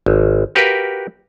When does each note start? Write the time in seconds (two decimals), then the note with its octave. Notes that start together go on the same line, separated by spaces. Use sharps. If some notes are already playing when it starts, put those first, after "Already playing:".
0.06 G#1
0.55 F#4 G4 A#4 B4 F5